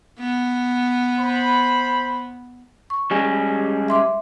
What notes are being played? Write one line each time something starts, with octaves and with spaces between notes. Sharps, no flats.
B3
C5 B5
C#6
G3 G#3 C#4
E5 C6 D6